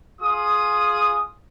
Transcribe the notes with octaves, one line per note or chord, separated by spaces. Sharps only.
F4 G#4 D#6